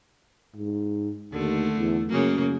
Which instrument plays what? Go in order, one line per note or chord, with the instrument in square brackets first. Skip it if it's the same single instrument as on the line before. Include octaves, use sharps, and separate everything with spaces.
[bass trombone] G#2
[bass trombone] D#2 [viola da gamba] D3 A3
[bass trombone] E2
[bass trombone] F#2 [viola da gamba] C#3 A#3